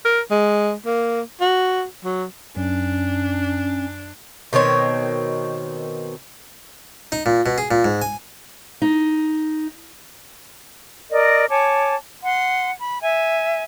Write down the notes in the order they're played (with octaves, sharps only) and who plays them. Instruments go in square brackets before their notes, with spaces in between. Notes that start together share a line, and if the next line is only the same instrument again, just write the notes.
[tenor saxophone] A#4
G#3
A#3
F#4
F#3
[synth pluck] F#2 [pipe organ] C#4 [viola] D4
[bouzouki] B2 D#3 C4 C#5
[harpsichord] D#4
A#2
B2
G#4
A#2
G#2
G#5
[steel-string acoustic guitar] D#4
[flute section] A#4 D5 D#5
C#5 G#5 A5 D6
F#5 C6
B5
E5 G#5